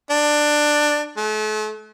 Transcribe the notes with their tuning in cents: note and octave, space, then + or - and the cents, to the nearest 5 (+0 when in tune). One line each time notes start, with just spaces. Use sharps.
D4 +15
A3 -40